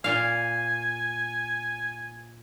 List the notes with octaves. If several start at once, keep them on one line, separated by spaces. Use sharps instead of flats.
A#2 F5 G#5